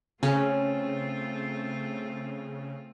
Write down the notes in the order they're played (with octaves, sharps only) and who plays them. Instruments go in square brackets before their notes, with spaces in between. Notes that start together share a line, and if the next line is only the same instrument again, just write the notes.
[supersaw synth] C#3 [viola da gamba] A3 C4 F4 [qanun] C#4